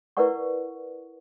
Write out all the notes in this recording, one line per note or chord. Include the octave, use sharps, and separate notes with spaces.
E4 A#4 B4 D5 F#5 C#6